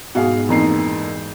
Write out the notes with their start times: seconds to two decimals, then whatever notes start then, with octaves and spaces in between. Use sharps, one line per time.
0.15 G#2 B2 F#4 G#4 F5
0.49 F2 A#2 E3 D#4 C7